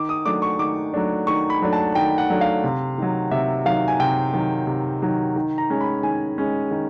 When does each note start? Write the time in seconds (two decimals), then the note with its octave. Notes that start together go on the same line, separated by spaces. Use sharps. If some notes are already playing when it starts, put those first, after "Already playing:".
Already playing: D#3 D6
0.09 D#6
0.26 F#3 A3 D4 D6
0.42 C#6
0.59 D#3 D6
0.94 F#3 A3 D4
1.27 D#3 C#6
1.50 B5
1.62 F#3 A3 D4
1.73 A5
1.95 D#3 G5
2.18 F#5
2.30 F#3 A3 D4
2.41 F5
2.64 C3
2.98 D#3 F#3
3.31 C3 E5
3.66 D#3 F#3 F5
3.88 G#5
4.00 C3 G5
4.33 D#3 F#3
4.67 C3
5.02 D#3 F#3
5.36 D#3
5.58 A#5
5.70 G#3 C#4
5.81 B5
6.03 D#3 G#5
6.38 G#3 C#4
6.71 D#3